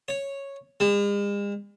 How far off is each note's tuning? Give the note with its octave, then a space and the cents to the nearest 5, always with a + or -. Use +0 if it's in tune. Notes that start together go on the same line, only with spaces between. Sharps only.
C#5 -5
G#3 -45